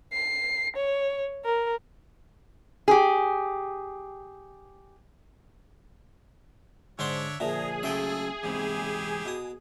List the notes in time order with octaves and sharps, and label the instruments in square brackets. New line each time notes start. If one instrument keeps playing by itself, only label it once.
[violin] C7
C#5
A#4
[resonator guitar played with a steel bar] G4 G#4
[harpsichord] G#2 C5 C6 [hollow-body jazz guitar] D3 [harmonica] D4 C#5 E5
[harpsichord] A#2 D3 F3 [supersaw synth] G#4 [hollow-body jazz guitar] E5 [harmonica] A#5
[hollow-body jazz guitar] C#3 F#3 A3 [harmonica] A4 [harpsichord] E5 G5 G#5
[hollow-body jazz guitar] E2 G#2 C3 [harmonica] E4 G4
[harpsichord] B2 D#6